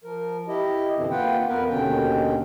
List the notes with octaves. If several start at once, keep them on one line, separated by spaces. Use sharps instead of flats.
F3 A#4
E4 G4 D#5
F#2 B2 D3 E3 C4
A#3 F4 B4 F#5 G5
F2 B3 A#4 B4
D#2 B2 D3 D#3 C#4 G5